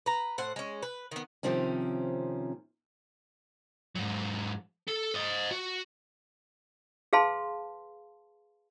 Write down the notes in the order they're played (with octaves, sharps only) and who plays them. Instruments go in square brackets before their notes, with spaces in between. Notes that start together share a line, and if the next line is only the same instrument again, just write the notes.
[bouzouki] B4 A#5
A2 C5 F#5
G#3 C#4
B4
D#3 B3
[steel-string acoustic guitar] C3 D#3 F3 C4 C#4
[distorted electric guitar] G#2 F#3
A4
C5 D#5
F#4
[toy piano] G#4 B4 F5 A5 C6